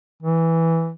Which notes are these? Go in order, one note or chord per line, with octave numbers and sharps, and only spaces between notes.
E3